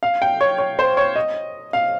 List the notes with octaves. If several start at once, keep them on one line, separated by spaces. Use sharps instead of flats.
F5
G5
C#5
C#5
C5
C#5
D#5
F5